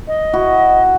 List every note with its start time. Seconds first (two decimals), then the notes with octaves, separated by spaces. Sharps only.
0.08 D#5
0.33 E4 F#4